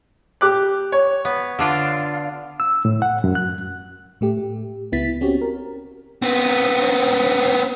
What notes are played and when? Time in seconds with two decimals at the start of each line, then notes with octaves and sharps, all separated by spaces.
0.41 G4 D6 F#6
0.92 C#5
1.25 B3
1.59 D3 D4 F4
2.60 E6
2.85 A2
3.02 F#5
3.24 F#2
3.35 F#6
4.21 A2 A3 G4
4.92 C#2 B3 E4 A6 B6
5.21 C4 C#4 F#4 G4 C#5
5.42 A#4
6.22 B3 C4